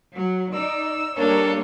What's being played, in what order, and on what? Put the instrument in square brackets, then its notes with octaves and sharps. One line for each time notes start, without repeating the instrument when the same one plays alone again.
[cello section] F#3
[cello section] D#4 D5 [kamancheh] E6
[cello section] G3 A#3 C#5 [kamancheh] D4 A4